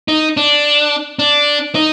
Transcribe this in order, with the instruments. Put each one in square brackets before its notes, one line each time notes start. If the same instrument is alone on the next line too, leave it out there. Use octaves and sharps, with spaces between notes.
[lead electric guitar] D#4
D4
D4
D#4